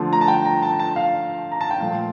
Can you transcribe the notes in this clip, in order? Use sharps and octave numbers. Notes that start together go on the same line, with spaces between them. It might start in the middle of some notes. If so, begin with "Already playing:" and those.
Already playing: D3 F3 A3 A5
A#5
A5
G5
A#5
A5
A5
F5
A#5
A5
G5
A#2 F3 A3 F5